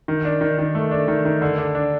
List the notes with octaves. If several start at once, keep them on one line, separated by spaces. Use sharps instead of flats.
D#3
D4
D#3
D#3
A3
D4
D#3
D#3
D3
D4
D4